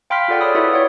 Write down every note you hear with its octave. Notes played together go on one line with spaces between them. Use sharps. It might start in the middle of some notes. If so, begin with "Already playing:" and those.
F5 G5 B5 C6 F6 B6
F4 G#4 A4 D5 F#5 G5
C#5 B5 D#6 E6
E4 F#4 B4 E5 F#5
C#5 D5 F#5